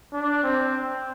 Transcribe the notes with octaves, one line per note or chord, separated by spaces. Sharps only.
D4
C4